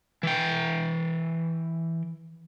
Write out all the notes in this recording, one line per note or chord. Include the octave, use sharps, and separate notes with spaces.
E3 G5